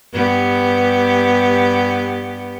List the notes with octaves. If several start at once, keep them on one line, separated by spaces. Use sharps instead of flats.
G2 B3 G4